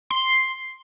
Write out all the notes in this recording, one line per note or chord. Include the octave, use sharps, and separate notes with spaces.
C6